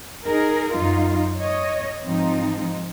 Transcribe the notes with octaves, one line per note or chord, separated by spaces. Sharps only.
D#4 G#4 A#4
F#2 D#4 F4
C#5 D#5
G#2 F3 C4 D#4